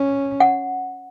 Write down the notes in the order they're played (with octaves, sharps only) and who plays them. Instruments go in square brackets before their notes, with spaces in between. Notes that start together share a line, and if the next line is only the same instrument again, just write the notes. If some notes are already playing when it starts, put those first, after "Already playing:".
Already playing: [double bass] C#4
[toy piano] F#5